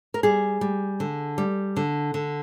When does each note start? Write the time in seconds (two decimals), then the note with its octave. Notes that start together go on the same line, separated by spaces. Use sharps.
0.14 A#4
0.23 G3 G#4
0.61 G3
1.00 D3
1.38 G3
1.77 D3
2.14 D3